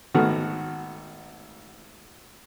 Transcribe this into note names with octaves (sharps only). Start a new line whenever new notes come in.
G#1 D#3 A3 B3 F#4 F6